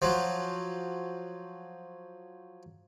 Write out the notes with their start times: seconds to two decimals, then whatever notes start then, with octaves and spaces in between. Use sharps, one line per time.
0.02 F3 F#3